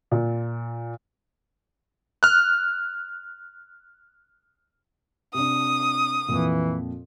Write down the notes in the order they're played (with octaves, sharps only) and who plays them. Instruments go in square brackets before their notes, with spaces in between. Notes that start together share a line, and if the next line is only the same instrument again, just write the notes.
[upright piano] A#2
[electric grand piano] F6 F#6
[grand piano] C3 D4 [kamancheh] D#6
[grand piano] F2 A#2 [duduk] E3